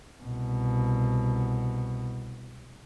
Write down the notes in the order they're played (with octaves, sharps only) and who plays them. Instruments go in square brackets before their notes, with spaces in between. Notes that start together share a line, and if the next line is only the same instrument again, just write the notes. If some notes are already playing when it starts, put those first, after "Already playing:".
[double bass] C2 B2